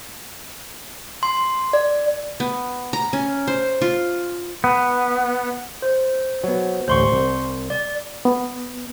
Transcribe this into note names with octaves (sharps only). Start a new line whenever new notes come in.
C6
D5
B3
A#5
C#4
C5
F4
B3
C5
F#3 B3
A1 D2 C5 C6 C#6
C2
D5
B3